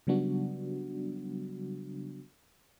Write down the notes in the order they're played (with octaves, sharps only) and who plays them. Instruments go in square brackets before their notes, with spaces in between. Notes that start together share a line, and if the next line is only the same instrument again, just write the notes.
[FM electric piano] C#3 F#3 G3 B3 D4 F#4